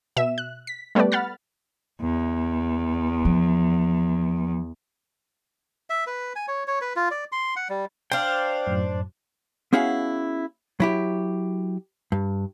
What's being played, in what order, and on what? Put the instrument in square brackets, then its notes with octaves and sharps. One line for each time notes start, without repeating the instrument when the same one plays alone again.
[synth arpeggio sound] B2 E5 E7
F#6
B6
G3 A3 B3 G4 B4 D5
F#5 B5 F6 A6
[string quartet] E2
[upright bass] F3
[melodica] E5
B4
G#5
C#5
C#5
B4
F4
D5
C6
F#5
G3
[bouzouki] D4 C5 [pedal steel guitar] F5 G5
[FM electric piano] F#2 A2 F#3
[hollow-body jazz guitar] B3 C#4 E4 F#4 G#4 F5
F#3 E4 G4
G2